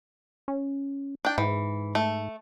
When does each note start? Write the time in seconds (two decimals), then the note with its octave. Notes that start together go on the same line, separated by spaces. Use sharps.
0.48 C#4
1.25 D4 G5
1.38 G#2 E3
1.95 A3